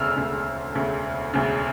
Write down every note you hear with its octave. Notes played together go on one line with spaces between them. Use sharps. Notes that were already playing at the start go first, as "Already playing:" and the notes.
Already playing: E1 D2 C#3 E6 F6
E1 D2 C#3
E1 D2 C#3
E1 D2 C#3